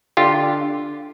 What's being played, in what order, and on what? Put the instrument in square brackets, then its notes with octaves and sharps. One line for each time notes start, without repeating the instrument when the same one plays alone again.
[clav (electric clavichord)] D3 F4 G4